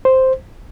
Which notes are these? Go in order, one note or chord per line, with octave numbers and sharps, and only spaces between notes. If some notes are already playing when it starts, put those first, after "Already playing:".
C5